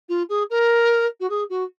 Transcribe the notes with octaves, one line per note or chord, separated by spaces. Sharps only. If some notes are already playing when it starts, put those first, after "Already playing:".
F4
G#4
A#4
F#4
G#4
F#4